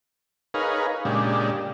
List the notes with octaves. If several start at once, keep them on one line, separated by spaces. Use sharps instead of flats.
D#4 G#4 A#4 B4 C#5 F5
A#2 C#3 G#3 D4 G4